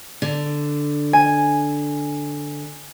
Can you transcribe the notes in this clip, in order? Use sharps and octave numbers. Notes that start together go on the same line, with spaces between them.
D3
G#5